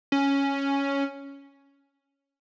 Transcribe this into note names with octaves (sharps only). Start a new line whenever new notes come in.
C#4